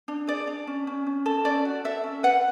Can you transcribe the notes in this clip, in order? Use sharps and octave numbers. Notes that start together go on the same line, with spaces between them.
D4
G#4 D5
D4
C#4
C#4
C#4
A4
C#4 D5
F#4
A4 E5
C#4
B4 F#5